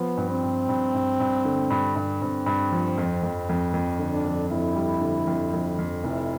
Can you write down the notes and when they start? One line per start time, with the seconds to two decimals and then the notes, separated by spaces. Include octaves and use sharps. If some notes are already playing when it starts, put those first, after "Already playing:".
Already playing: F3 B3
0.17 G2
0.30 C4
0.43 G2
0.69 G2
0.94 G2
1.20 G2
1.45 D3
1.70 G2
1.96 G2
2.21 G2 C4
2.46 G2
2.72 F3
2.98 F2
3.23 F2
3.49 F2
3.74 F2
3.99 D3
4.12 D4
4.25 F2
4.50 F2 E4
4.76 G3
5.01 D3
5.27 F2
5.53 F2
5.79 F2
6.04 F1 E4